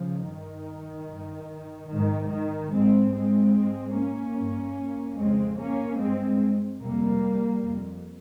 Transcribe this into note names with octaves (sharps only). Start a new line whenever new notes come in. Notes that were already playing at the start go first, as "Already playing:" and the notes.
Already playing: C#3 F3
G2 D#3
G2
G#2 D#3
D#3
G#2 G#3 C4
G#3 C4
G#2
A#3 C#4
G2
F2 C#3 G#3 C4
A#3 C#4
G2 G#3 C4
F2 C3 G3 A#3
F2 C3